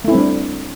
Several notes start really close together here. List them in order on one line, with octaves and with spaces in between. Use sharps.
A3 E4 C4 G3 D4